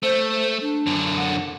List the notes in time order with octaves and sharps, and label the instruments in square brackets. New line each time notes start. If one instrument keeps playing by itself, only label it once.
[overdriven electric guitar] A3 [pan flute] C5
[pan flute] D4
[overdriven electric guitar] F#2 D3
[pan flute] F#5